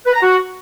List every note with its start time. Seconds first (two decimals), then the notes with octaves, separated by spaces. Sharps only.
0.05 B4
0.13 A#5
0.22 F#4